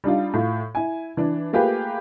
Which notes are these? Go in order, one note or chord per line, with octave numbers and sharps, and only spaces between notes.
G3 D4 D#4 F4
A2 F4
E4 G#5
E3 D4
A3 A#3 F4 G4 G#4 B4